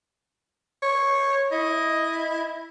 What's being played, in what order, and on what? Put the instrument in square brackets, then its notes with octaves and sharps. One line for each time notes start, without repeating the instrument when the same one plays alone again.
[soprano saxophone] C#5
[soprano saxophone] E4 [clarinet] D#5